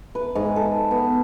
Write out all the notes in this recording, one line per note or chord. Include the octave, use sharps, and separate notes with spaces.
B4
G#2
A4
B3